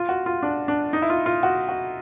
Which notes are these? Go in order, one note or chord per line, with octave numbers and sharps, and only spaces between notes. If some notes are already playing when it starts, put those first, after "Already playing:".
Already playing: F4
F#4
F4
D4
D4
D#4
E4
F4
F4
F#4
F#4